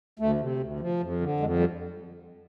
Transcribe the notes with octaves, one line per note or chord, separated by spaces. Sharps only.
D2 A3
C3
D2
F3
F2
D3
F2 G#3
G3